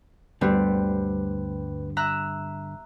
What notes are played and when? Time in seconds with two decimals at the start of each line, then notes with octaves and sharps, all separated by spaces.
0.41 D2 G2 D3 G3 B3 C4 B4
1.97 E5 A#5 F#6